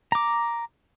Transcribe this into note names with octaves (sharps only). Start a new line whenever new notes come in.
A#5 D6